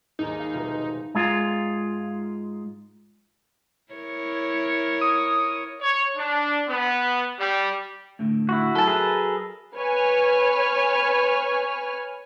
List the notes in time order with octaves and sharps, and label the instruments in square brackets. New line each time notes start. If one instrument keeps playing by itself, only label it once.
[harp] D#2 G#2 [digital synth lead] D#4
[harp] F5
F1 B2 F4
[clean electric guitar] G#2 G#3 F4
[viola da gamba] E4 A#4 C#5
[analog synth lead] D#6
[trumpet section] C#5
D4
B3
G3
[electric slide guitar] A2 D3 A3
[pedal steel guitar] E4 F#4
[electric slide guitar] F#3 E5 [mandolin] A4 A5
[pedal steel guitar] G#4 A#4 B4
[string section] B4 C#5 G#5 F6